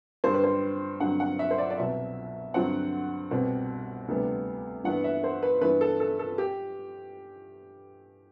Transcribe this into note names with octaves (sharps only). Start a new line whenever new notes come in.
G2 D3 G3 C5
B4
C5
G2 D3 F#3 C4 F#5
F#5
E5
C5
D5
D5
C2 B2 F#3 E5
G2 D3 F#3 C4 F#5
C2 B2 G3 C4
D2 C3 G3 B3
G2 E3 B3 F#5
E5
C5
B4
G2 E3 B3 B4
A4
A4
A4
G4